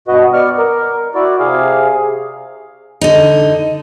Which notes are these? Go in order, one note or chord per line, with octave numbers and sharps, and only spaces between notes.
G2 B2 F#4 B4 D#5
B3 D5 C#6 F6
A#4
E4 F#4 D5
C3 G#4 F5
D3 D#4